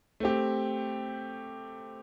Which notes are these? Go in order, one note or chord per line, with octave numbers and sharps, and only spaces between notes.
A3 C4 G4